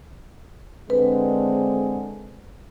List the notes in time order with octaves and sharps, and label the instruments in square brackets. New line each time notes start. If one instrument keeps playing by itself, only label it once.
[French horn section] D3 G#3 C4 [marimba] B4